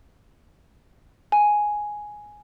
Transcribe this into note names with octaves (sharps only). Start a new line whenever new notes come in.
G#5